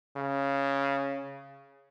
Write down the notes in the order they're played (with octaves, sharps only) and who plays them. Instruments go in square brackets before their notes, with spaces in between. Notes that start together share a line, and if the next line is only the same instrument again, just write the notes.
[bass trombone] C#3